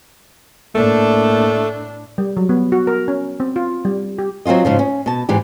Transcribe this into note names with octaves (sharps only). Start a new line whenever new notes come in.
A2 A3 A#3 D4
G3
F#3
B3
F#4
A#4
C#4
C4
F4
G3
G4
F#3 C4 C#4 F4 D#5
G#2 C#3 F3
C#4
B2 A5
G#2 E3 G4